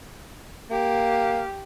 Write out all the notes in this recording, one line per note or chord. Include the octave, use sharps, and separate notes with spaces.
A#3 G4